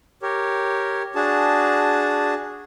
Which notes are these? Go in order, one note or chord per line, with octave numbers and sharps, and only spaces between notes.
G4 A#4 C#5
D4 F#4 G#4 A5